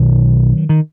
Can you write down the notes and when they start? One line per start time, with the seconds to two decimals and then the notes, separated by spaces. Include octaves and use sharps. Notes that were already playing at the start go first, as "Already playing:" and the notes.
Already playing: B1 B2 D#3 F#3
0.69 D#3